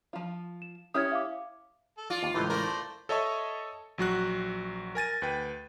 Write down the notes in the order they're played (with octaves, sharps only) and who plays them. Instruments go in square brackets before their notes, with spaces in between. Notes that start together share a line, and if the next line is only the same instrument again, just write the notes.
[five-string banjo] F3 F4
[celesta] E7
[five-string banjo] C#4 E4 G4 [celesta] D#6 F6 G#6
[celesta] E5 F5 D6
[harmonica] A4
[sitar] F4 [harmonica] D5
[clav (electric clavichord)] D#2
[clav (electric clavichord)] C#2 A2 E3 [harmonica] D#4 G4 C5
[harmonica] A3 C5 D5 [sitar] A#4
[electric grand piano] A4 C#5 D#5 E5 A5 C#6
A#1 F#3 F#4 F#6
A#4 G#5 A6 D#7
D2 B4 G5